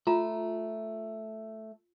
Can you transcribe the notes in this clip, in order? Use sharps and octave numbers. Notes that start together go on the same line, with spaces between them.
A3 F4 A#5